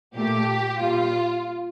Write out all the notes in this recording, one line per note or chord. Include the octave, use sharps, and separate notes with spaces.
A#2 A3 G4
A#2 G3 F4